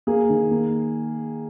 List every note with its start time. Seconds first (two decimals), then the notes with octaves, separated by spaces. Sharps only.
0.07 A#3 G#4
0.29 D#3
0.51 A#3